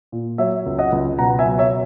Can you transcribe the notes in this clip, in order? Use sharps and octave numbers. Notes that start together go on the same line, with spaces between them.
A#2
F#3 C#5 E5
C#2
D#5 F#5
C#2
B2 F#5 A#5
E5 G#5
F#3
C#5 E5